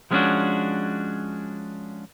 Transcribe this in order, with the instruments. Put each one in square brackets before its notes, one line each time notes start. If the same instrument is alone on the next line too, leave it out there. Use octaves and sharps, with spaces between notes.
[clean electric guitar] F3 G#3 B3 C#4 D4 F#4